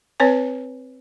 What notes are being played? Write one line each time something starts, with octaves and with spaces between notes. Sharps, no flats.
C4 B4 C#5 G#5